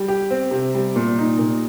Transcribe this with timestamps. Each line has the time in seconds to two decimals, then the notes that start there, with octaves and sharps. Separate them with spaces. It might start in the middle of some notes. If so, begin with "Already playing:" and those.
Already playing: G3
0.08 G4
0.30 C4
0.51 C3
0.74 G3
0.96 A#2
1.18 D#4
1.39 A#2